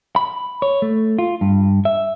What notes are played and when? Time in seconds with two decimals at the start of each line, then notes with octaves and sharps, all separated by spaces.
0.16 B5
0.62 C#5
0.82 A3
1.19 F4
1.41 G2
1.85 E5